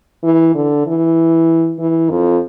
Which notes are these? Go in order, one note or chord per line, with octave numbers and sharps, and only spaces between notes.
E3
D3
E3
E3
F2